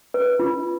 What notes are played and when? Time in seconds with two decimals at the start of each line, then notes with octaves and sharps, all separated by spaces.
0.14 B4
0.39 F4